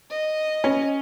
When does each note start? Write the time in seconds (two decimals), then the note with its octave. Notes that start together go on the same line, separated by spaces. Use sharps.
0.10 D#5
0.64 C#4